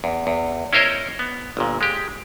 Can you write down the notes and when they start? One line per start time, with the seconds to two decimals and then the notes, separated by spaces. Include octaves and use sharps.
0.04 E2
0.27 E2
0.73 C#4 E4 A#4 C5 C#5 D#5
1.19 B3
1.57 G1 A#2
1.81 G#3 G4